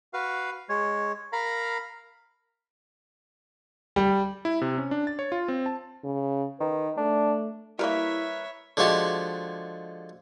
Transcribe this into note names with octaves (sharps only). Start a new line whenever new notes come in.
F#4 B4 F5
G#3 C#5
A#4 F5 A#5 B5
G3
E4
C3
C#4
D4
A6
C#5
F4
C4
A5
C#3
D#3 B4
A3 D4
G3 A#3 E4 A#4 B4 C#5 E5
D3 F3 G#3 F#4 G4